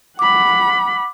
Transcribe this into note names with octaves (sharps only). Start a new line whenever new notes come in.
F#5 B5 D6